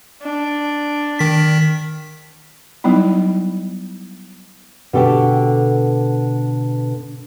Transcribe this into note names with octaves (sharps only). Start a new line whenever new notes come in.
D4
D#3 B6
F#3 G3 B3 D#4 E4
B2 D3 G4 A4 G5